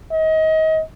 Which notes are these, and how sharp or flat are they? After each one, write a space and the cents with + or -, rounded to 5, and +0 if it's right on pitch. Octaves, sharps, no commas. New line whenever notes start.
D#5 +30